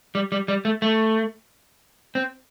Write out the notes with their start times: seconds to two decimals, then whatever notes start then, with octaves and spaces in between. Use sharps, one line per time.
0.15 G3
0.32 G3
0.48 G3
0.65 A3
0.82 A3
2.15 C4